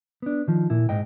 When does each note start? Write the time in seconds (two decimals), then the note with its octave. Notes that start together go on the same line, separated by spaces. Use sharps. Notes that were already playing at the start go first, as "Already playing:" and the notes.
0.22 B3 D4
0.48 D#3 F3
0.70 A#2 E4
0.89 G#2 D#5 G5